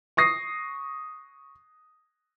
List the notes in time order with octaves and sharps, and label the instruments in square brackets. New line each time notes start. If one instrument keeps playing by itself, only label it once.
[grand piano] C#6 D#6 A#6 C7